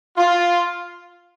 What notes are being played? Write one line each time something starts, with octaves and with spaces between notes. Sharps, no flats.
F4